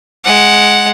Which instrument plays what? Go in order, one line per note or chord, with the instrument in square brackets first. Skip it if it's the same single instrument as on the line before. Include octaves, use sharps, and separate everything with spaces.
[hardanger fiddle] G#3 F#5